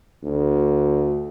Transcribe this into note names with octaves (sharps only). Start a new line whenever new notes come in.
D2